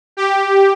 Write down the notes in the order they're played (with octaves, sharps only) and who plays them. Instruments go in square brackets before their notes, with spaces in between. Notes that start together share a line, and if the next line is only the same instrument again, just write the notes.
[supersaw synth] G4